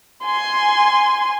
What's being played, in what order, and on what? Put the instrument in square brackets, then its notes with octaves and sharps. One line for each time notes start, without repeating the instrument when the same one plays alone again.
[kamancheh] G#5 C6